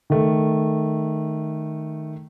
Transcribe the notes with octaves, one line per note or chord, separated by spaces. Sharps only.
D#3 A3